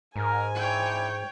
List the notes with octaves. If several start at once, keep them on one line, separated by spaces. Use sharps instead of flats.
G#2 A#4 G#5
C4 D4 E4 C#5 G5